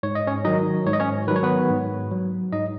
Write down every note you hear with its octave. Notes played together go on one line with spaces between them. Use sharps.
G#2 C#5
D#5
C#4 C#5
D#3 F#3 D#4 D#5
G#2 C#5
D#5
C#4 C#5
D#3 F#3 B4
C#5
B3 B4
G#2
F#3
G#2 D#4 D#5